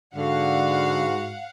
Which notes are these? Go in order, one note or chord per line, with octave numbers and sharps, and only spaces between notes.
G#2 D3 F#4 F5 F#5